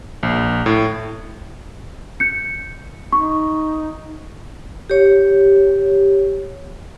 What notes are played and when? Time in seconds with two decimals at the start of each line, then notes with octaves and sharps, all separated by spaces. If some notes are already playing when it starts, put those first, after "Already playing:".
0.23 A#1
0.66 A2
2.20 G6 C#7
3.13 D#4 C#6
4.90 G4 C#5